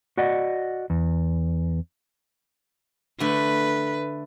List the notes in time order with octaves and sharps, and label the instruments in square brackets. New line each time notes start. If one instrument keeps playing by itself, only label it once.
[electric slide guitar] F#4 D5 D#5 F#5
E2
[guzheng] D3 A3 [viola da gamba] B4